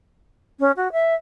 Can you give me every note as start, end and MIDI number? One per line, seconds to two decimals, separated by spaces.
0.60 0.72 61
0.77 0.92 66
0.92 1.15 76